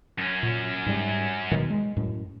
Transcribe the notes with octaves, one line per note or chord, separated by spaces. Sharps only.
F#2 C#4
A#2
G#2 G3
B2 D#3 F#3
G#3
F#2 A2